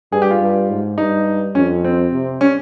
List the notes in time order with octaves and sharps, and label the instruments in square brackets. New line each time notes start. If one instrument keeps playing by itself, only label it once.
[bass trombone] G2 [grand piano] G#4
[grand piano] G4
F4
[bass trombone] G2
G#2
[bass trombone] G2 [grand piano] D#4
[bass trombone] F2 [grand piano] C#4
[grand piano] C4
[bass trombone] C3
[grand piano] C#4